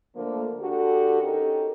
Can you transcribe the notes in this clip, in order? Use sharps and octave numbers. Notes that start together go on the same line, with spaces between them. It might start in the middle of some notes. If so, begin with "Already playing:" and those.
D3 F3 A3 A#3
D3 F#4 G4 A4
C#4 D#4 G4 A4 A#4